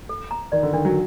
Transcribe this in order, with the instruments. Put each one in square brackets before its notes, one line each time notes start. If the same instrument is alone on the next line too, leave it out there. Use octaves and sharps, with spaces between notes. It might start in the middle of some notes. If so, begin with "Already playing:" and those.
[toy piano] A4
A#5
[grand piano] D#3 [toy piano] D5
[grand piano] D3
[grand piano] D#3 [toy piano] D4
[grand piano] F#3